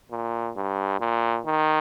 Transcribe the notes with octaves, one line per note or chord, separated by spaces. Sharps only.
A#2
G2
A#2
D#3